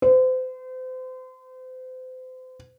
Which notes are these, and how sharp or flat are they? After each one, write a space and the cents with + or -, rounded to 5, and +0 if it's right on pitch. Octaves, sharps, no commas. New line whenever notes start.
C5 -35